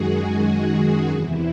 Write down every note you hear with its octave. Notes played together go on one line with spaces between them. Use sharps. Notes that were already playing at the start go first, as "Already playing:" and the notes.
Already playing: F#2 D#3 G#3 F#4 G#4
E2 C3 E3 E4